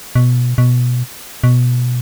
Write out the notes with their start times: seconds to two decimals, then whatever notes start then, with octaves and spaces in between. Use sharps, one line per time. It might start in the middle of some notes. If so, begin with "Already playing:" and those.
0.15 B2
0.58 B2
1.44 B2